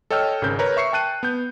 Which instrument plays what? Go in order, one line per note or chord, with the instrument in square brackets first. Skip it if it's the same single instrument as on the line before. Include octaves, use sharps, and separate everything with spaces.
[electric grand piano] A4 C#5 D#5 G5 E6 F6
G#1 C#3 A#4 G6
A#4 B4 C#5 A#5
E5 C#6 C7 C#7
G5 A5 F#6 D#7
B3 G6